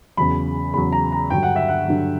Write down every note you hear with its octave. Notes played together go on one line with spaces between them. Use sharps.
E2 C#3 F#3 B5
E2 C#3 F#3 B5
A#5
A#5
G2 D3 F#3 G5
F#5
E5
F#5
G2 D3 F#3